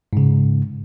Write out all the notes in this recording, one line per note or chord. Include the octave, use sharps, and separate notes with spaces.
G#2 C#3